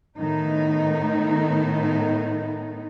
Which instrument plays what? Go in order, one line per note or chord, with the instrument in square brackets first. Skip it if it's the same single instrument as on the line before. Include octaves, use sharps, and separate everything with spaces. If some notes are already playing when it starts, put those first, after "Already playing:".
[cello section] A2 D#3 B3 D#4